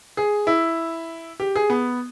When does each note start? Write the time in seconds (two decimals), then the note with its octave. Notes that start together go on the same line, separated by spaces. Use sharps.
0.17 G#4
0.47 E4
1.40 G4
1.56 G#4
1.70 B3